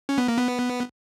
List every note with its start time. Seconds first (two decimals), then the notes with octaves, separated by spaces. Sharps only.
0.09 C#4
0.18 B3
0.28 A#3
0.37 B3